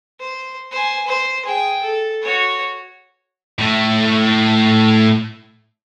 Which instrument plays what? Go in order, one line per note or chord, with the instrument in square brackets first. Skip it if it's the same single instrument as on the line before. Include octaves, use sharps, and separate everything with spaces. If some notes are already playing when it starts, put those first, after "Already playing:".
[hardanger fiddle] C5
C5 G#5
C5
G#4 G5
A4
F#4 C#5
[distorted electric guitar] A2 A3